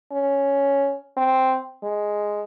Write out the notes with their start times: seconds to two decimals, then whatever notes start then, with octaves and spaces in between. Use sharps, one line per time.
0.12 C#4
1.17 C4
1.84 G#3